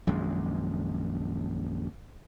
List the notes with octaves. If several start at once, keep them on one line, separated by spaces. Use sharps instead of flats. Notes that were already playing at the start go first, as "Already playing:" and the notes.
A#1 F#2 D#3 G#3